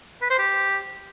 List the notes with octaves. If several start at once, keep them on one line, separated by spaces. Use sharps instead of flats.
B4
C5
G4